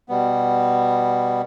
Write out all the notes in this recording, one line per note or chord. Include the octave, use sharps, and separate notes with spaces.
B2 G3 B3